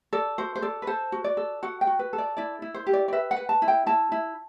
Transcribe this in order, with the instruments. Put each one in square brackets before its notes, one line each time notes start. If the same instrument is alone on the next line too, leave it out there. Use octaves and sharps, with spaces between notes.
[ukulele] A4 D5
F#4 C5
C5
A4 D5
B4
A4 C5
F#4
D5
A4
F#4 F#5
G5
F#4
B4
A4
D5
E4 D5
E4
C5
G4
D5
D5
B4 E5
F#5
B4
A5
E4
G5
E4 A5
E4